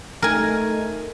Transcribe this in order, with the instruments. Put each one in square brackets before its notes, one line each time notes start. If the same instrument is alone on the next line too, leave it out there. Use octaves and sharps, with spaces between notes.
[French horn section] A3 D#4 [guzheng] A#4 G#5